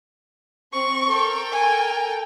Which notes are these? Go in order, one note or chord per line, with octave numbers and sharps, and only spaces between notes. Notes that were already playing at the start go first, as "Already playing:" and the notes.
C4 C#6
A4 A#4 G5
G#5